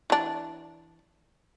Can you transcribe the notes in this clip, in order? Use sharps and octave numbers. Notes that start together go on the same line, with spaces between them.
E3 D4